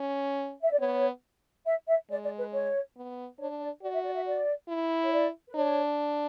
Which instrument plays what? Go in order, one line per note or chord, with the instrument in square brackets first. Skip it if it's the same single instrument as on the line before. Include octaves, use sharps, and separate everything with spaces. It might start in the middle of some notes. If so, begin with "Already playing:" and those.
Already playing: [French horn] C#4
[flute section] E5
D5
[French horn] B3 [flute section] C#5
[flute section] E5
E5
[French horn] G#3 [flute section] D5
[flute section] D5
B4
C#5
[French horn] B3
[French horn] D4 [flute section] C#5
[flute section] D5
[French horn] F#4 [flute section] D5
[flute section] E5
D5
E5
D5
[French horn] E4
[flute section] C#5
D5
B4
[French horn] D4 [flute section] C#5